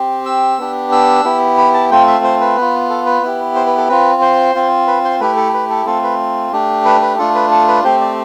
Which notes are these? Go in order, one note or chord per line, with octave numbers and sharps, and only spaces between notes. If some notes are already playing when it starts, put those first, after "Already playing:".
Already playing: C4 G4
E6
B3 D4 G4
E6
B3 E4 G4
B5
A5
A3 C4 F4 G5
E5
C5
B4
B3 F4
A4
B4
B3 E4 G4
C5
B4
A4
C4 F4 B4
C5
C4 F4
B4
C5
A3 E4 G4 B4
A4
B4
A4
A3 C4 F4 A4
B4
A3 D4 G4
B4
B4
A3 D4 F4 A4
B4
A4
B4
A3 C4 G4 C5
D5